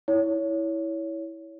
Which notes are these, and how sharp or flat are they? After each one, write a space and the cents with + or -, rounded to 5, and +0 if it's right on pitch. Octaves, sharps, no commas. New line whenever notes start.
E4 -10 C#5 +15